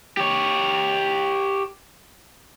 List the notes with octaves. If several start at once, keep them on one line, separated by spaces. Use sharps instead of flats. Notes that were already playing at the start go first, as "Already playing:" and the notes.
G4 C#5